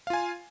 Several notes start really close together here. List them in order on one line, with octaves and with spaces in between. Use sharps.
F5 F4 G#5